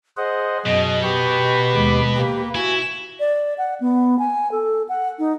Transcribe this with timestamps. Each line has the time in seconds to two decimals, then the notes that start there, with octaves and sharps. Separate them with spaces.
0.17 G#4 C5 D#5 F#5
0.66 F#2 B2 D#5
1.02 G4 B4 G5 C#6
1.75 D#2 G#3 D6
2.16 A#3 G4
2.55 E4 F#4 G#5
3.20 D5
3.58 F#5
3.81 B3
4.19 G#5
4.52 A4
4.89 F#5
5.19 D#4